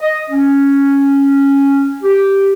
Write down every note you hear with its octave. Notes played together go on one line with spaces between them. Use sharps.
D#5
C#4
G4